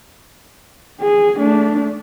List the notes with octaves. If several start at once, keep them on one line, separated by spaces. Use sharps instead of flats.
G#4
A3 D4